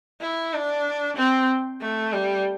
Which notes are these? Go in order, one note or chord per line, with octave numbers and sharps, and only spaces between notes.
E4
D4
C4
A3
G3